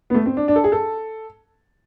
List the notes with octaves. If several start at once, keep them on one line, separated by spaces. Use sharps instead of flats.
B3
A3
C4
D4
D4
A4
G#4
A4